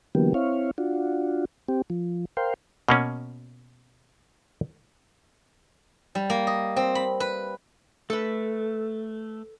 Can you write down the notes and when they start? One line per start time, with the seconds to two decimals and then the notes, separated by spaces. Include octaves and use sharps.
0.15 D3 E3 F#3 A#3 B3 G4
0.34 C4 E4 C#5 F5
0.78 D4 F4 F#4
1.68 C4 G4
1.90 F3
2.37 A#4 C5 F5 G5 C6
2.89 B2 A#3 C#4
6.15 G3
6.30 A#3
6.47 D#5
6.76 C4
6.95 B5
7.20 B4
8.10 A3 A4 B4